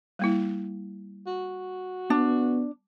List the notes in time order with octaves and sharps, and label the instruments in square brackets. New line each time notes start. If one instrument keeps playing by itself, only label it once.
[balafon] G3 A#3 E4
[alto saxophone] F#4
[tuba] B3 [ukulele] D4